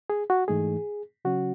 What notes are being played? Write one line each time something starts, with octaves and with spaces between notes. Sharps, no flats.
G#4
F#4
G#2 E3 A3 D#4 G#4
C#3 F#3 C#4 F#4